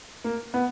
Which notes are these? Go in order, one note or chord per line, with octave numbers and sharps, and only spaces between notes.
A#3
B3